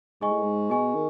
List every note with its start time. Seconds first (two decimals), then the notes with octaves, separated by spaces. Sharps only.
0.21 G#2 G#4 D#5 G#5 C#6
0.32 A2
0.42 G#2
0.70 B2 G#4 D#5 G#5 C#6
0.94 D#3